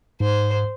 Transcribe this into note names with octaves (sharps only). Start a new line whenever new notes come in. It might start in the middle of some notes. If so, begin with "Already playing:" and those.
G#2 C5